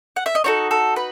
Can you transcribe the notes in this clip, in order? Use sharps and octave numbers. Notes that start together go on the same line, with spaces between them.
F#5
E5
D#5
D#4 F#4 A4 C#5
A4
B4